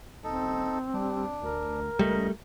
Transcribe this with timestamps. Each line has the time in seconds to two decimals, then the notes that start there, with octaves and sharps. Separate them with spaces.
0.24 D#1 C4 D#4 A4
0.93 G3 D4
1.42 D2 A#4
1.99 C#2 G3 A3 D#5